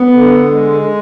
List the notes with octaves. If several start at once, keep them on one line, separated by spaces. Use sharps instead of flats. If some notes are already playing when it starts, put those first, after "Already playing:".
Already playing: B3
D3
G#3